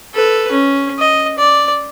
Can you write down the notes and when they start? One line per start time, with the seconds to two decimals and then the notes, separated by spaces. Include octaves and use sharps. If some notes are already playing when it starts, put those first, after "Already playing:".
0.14 A4 B4
0.52 C#4
0.99 D#5
1.38 D5